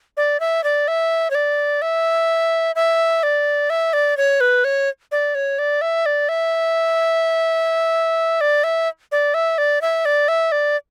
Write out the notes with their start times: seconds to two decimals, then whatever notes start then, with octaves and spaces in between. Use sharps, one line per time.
0.17 D5
0.40 E5
0.64 D5
0.88 E5
1.30 C#5
1.35 D5
1.82 E5
2.75 E5
3.23 D5
3.70 E5
3.93 D5
4.17 C#5
4.41 B4
4.64 C#5
5.12 D5
5.35 C#5
5.59 D5
5.81 E5
6.06 D5
6.29 E5
8.41 D5
8.64 E5
9.12 D5
9.34 E5
9.58 D5
9.81 E5
10.05 D5
10.28 E5
10.52 D5